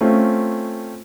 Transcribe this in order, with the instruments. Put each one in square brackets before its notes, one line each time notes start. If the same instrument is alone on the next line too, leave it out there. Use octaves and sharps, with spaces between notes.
[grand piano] A3 C4 C#4 F4